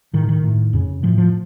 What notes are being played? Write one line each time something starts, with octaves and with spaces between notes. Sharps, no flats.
A2 D#3
D#3
A2
F2 C#3
A2 F3
F3